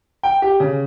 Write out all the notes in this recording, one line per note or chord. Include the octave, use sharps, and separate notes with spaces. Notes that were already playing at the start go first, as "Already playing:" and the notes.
G5
G4
C#3